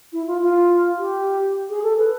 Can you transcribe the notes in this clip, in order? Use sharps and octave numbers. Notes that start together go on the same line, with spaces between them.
E4
F4
F4
G4
G#4
A4
B4